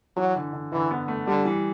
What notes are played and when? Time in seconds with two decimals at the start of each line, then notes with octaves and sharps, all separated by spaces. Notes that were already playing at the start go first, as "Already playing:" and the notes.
0.16 E3 F#3
0.36 D3
0.53 D3
0.72 D3 E3
0.91 B3
1.08 A3
1.27 D3 G3
1.45 E3